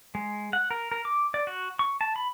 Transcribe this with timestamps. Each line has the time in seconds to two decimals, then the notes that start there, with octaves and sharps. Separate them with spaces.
0.15 G#3
0.53 F#5
0.71 A#4
0.92 A#4
1.05 D6
1.34 D5
1.47 F#4
1.79 C#6
2.01 A5
2.16 B5